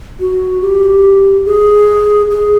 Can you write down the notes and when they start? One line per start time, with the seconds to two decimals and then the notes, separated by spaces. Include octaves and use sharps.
0.20 F#4
0.61 G4
1.46 G#4
2.31 G#4